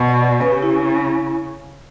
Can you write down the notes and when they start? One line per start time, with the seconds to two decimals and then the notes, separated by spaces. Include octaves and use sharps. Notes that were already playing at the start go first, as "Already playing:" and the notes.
Already playing: B2
0.08 D5
0.41 C#3 B4
0.52 G4
0.62 E4